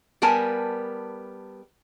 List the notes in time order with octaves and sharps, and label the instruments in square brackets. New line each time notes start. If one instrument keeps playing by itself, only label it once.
[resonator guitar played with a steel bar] G3 B3 A#4 G#5 A5